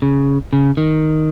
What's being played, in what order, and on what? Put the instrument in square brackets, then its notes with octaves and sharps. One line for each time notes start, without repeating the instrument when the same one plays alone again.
[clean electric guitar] C#3
C#3
D#3